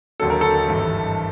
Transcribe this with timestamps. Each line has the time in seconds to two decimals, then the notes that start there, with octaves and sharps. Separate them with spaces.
0.20 D#2 D3 F#3 A4
0.30 A#4
0.41 A4
0.68 G#1 G2 E3